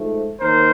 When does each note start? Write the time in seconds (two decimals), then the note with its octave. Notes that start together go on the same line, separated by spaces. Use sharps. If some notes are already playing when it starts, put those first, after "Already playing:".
Already playing: G#2 F3 A3
0.41 D#2 D#3 A#4 C5